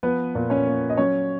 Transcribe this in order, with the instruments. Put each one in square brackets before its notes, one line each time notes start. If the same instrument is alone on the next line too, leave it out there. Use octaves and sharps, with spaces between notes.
[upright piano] F3 B3 B4
A#2
C#4 C#5
A#3
D#5
F#3 C#4 C#5